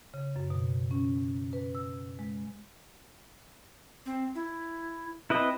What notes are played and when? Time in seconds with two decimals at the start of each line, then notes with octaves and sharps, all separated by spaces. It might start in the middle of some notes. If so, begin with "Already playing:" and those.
0.14 C#3
0.36 F#2
0.50 B2
0.91 C#4
1.53 B4
1.75 E6
2.19 G#3
4.06 C4
4.35 E4
5.30 C4 E4 B4 D#5